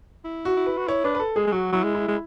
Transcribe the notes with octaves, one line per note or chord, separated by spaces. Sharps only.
E4
F#4
E4
B4
F#4
E4 C#5
D4 B4
B4
A4
G#3 G#4
G#3
F#3 F#4
F#3 E4
G#3
E4
G#3